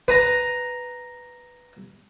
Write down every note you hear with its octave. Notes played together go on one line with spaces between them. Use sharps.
B4 A#5